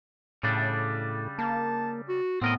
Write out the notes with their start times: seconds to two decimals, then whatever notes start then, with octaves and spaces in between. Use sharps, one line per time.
0.43 A2 C#3 G3 D4
1.39 A#3 A5
2.09 F#4
2.42 A2 B3 C4 A#4 D#5